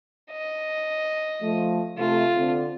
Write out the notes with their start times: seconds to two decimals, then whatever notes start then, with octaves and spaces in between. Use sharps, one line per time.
0.32 D#5
1.41 F3 A3
1.98 C3 A3 F4
2.36 D3 C4